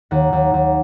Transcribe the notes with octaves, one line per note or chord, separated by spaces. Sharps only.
D#2 F#5
D#2
D#2